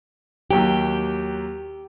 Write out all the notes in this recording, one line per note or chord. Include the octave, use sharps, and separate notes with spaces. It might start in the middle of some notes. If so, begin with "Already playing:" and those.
D#2 F#3 G4 G5